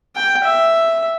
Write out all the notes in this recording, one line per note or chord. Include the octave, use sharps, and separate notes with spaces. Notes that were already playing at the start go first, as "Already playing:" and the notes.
G5
E5